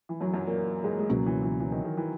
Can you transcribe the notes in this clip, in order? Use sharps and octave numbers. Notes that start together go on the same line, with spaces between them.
E3
F#2 F#3
F#2 F#3
A#2 A#3
G#2 G#3
G#3
C#2 F#2 B2 F#3 A#3 C#4
E3
E3
E3
D#3
D#3
E3